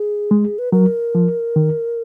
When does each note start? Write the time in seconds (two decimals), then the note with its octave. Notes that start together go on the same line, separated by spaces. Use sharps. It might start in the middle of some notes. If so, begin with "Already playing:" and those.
Already playing: G#4
0.31 G#3
0.59 B4
0.72 F#3 A#4
1.15 F3
1.56 D#3